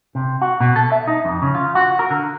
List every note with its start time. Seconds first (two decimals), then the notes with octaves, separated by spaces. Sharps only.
0.15 C3
0.42 F#4
0.60 B2
0.76 A4
0.92 E5
1.07 D#4
1.25 F2
1.42 C#3
1.55 F4
1.75 F#4
1.99 A#4
2.10 D3